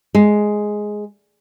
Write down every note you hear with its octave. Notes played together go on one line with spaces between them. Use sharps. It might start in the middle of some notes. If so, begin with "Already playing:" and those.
G#3